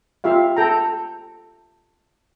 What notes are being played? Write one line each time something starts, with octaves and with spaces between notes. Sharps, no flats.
F4 G4 E5 F5
A4 G5 A#5